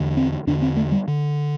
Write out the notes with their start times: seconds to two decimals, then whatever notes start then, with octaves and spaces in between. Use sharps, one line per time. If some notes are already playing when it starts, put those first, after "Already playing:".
Already playing: E2 D3
0.17 C4
0.47 E2 D3 D4
0.62 C4
0.76 A3
0.92 G3
1.08 D3